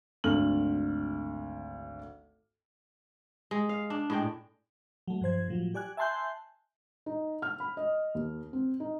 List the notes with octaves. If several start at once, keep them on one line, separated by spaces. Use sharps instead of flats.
G#1 D2 A3 F6 F#7
G#3
F5
D4
A2 G#3 G5
F#3 A3
G2 F3 C5 G#6
A2 F3 F#3
G4 D5 G#5 F#6
E5 G#5 A5 C6 F#6 G6
D#4
F6
B5
D#5
D#2
C4
D#4